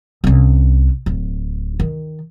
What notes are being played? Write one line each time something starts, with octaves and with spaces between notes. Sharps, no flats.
C2 C#4
D1
D#3